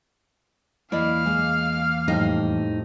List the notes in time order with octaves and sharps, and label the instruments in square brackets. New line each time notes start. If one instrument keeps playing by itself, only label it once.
[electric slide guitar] E2 A#3 [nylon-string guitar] E4 D5 D#5 [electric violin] F5 F6
[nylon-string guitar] G#3
[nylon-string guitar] F2 A2 G3 [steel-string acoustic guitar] D#4